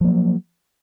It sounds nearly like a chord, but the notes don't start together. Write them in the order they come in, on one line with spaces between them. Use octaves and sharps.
F3 A#3 F#3